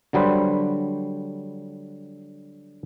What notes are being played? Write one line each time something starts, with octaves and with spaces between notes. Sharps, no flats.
D3 F#3 G3 B4 C5